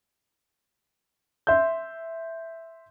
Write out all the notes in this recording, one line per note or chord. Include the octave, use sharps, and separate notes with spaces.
E5 C6 G6